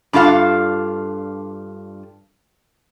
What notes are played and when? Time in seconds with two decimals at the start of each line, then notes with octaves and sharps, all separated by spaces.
0.13 G2 D4 F4 A4 F5 F#5